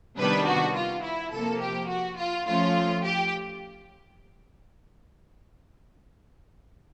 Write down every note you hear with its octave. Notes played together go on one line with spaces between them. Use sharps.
C3 D#3 G3 B3 D4 B4
F#4
F4
E4
C3 F3 A#3 A4
G4
F#4
F4
F3 A3 C#4 F4
G4